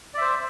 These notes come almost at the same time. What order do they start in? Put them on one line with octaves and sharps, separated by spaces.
D5 E5 C5